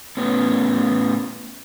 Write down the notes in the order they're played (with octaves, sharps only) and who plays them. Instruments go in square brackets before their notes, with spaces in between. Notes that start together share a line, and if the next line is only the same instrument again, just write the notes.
[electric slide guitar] A2 B3 C#4